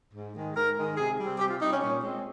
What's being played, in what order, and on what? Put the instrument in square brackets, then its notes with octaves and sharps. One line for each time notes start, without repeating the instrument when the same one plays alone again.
[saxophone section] G#2
D#3 G#3
G#2 A#4
D#3 G#3
C3 G#4
G3 C4
C3 G4
F4
G3 C4 D#4
C#4
A#2 C#4
G#3 C4